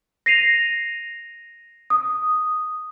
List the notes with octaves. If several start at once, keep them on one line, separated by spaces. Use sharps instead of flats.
A#6 C7 D#7 F7
D#6